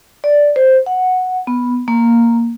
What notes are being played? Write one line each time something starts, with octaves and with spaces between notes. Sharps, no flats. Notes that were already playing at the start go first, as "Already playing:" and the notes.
D5
C5
F#5
B3
A#3